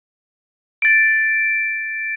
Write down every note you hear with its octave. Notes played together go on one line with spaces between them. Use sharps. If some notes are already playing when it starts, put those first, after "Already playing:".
A6 D7